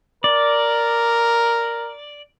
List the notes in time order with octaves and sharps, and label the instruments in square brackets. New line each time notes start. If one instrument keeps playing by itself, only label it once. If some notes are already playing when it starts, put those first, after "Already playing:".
[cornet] A#4 [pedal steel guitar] D5